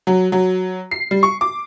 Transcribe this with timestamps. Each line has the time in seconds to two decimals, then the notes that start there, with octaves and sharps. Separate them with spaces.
0.07 F#3
0.32 F#3
0.91 C7
1.11 G3
1.23 C#6
1.41 D6